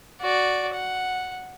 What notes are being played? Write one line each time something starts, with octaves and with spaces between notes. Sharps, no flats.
F#4 D5
F#5